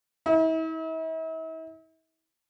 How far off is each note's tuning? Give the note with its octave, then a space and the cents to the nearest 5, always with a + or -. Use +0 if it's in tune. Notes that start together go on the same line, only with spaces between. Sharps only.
E4 -45